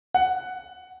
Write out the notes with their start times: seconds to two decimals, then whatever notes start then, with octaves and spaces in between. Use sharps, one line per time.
0.14 F#5